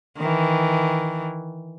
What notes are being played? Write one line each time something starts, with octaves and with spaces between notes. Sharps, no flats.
D#3 E3